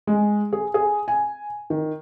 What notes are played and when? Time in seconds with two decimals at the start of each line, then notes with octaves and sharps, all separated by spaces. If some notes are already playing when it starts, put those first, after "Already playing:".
0.07 G#3
0.53 G#4
0.74 G#4
1.08 G#5
1.70 D#3